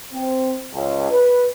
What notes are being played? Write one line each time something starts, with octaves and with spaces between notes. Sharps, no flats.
C4
C#2
B4